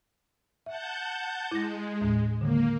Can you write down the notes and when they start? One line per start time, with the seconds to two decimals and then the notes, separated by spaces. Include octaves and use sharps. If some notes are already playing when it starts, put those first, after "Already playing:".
0.66 E5 F#5 A5 G6
1.51 G#3 E4 A#6
2.01 D#2 A2
2.41 D3 D#3 G#3 A#3